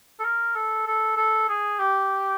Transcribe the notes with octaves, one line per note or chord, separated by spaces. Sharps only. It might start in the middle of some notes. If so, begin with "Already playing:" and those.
A4
A#4
A4
A4
A4
G#4
G4